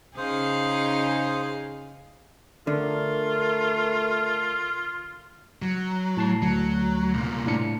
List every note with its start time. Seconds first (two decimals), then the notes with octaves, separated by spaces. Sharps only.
0.17 C#3 D#4 G#4 C5 F5 D#6
2.67 D3 A3 F4 A#4
5.62 F#3
6.17 A2 A5 C7
6.42 D2 F#3
7.14 C2 A#2
7.46 A2 D4 C#7